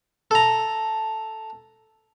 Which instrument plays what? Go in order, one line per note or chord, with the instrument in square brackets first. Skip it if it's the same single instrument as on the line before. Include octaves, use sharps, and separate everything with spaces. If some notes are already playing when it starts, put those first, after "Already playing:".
[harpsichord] A4 A#5